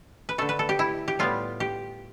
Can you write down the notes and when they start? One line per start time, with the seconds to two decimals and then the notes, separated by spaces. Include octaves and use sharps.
0.29 B4
0.38 D3 A3 A4
0.49 B4
0.59 A4
0.69 G4
0.79 E4
1.08 G4
1.19 A2 G3 B3 F4
1.60 G4